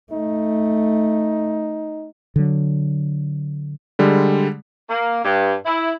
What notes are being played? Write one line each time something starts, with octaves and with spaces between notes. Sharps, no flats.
A3 D#4
D3 F#3
D3 G3 G#3
A#3
G2
E4